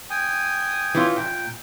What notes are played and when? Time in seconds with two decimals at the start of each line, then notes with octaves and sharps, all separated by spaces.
0.10 G5 G#5 D#6
0.95 E3 C#4 F4
1.16 A#2 G5